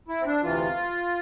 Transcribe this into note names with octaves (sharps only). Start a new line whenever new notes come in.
E4
C4
D4
D2 C3 E3 F4